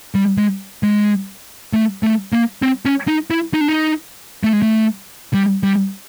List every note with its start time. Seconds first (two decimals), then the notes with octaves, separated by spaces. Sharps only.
0.15 G3
0.37 G#3
0.83 G#3
1.73 A3
2.03 A3
2.33 A#3
2.62 C4
2.85 C#4
3.08 D#4
3.30 E4
3.54 D#4
3.61 D4
3.68 D#4
4.44 A3
4.53 G#3
4.62 A3
5.34 G3
5.64 G3